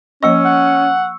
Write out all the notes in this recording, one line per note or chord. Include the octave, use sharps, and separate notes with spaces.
F3 A#3 C#4 D#5 C#6 E6 C#7
F#5